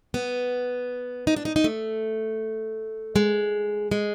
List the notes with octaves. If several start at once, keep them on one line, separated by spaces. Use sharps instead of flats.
B3
D#4
D4
D#4
D#4
A3
G#3
G#3